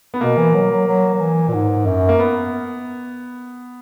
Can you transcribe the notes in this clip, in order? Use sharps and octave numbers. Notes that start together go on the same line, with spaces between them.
B3
B2 A#3
E3
F#3
F#3
F#3
F#3
E3
A#2
G#2
F#2
A#3
B3